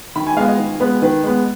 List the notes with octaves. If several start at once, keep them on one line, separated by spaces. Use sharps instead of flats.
D#3 B5
G#5
G#3 B3 F5
D#5
D#3
G#3 B3 B4
D#3 B4
G#3 B3